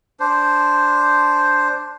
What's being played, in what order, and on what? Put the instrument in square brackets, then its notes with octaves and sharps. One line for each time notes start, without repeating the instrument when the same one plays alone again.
[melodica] D4 C5